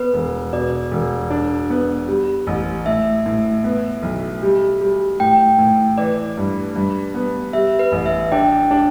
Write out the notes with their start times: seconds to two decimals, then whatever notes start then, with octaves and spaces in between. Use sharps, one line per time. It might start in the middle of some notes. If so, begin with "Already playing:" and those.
Already playing: B3 B4
0.14 E1
0.53 B2 D5
0.91 E1
1.30 D4
1.70 B3
2.08 G3
2.47 A1
2.86 A2 E5
3.26 A2
3.64 B3
4.03 B1
4.43 G3
4.81 G3
5.20 A2 G5
5.59 A2
5.98 E3 D5
6.37 G2
6.76 G2
7.14 B3
7.53 G3 E5
7.79 B4
7.92 A1
8.06 E5
8.32 D4 G5
8.71 D4